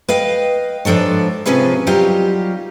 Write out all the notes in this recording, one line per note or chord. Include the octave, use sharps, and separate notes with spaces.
B4 D#5 F5 G5
G#2 F3 D4 A4 C#5
C3 F3 C#4 G#4 B4 F5
F#3 G3 D#4 F4 G4 F5